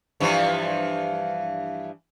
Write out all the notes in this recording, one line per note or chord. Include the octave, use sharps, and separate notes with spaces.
G2 E3 F3